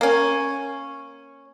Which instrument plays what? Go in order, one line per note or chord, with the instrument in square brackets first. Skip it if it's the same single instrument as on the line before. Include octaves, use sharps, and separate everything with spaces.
[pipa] A#3 C#4